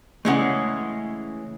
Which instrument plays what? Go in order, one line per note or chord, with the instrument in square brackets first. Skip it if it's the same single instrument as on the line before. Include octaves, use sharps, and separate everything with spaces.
[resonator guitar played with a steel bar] C#3 E3 G#3 [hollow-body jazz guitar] A3 C#4 F#5